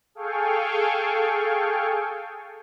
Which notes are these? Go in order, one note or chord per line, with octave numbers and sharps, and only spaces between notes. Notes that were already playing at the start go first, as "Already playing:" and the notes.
G#4 A4 F5 G5 G#5 C#6